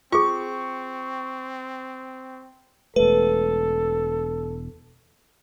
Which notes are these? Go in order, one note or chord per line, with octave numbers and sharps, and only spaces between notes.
C4 F4 G#4 C#6
E1 A3 A4 B4